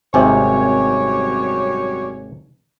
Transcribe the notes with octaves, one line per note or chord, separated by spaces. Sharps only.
G#1 F#2 C3 G3 C#5 G#5